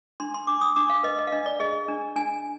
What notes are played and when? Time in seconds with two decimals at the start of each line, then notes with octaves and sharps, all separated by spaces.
0.20 D4 C6
0.34 C6
0.47 D4 D6
0.61 D#6
0.76 D4 D6
0.90 F5
1.03 B4 D#5
1.19 D#5
1.27 F5
1.32 D4 D#5
1.46 D5
1.60 G#4 D#5
1.88 D4
2.16 D4 G#5